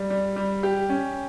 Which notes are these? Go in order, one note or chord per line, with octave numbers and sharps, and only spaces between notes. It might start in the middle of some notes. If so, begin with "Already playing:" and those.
Already playing: G3
G3
G3
G4
C#4